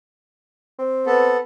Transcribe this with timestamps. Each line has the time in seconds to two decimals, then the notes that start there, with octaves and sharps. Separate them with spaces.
0.79 C4
1.07 B3 A4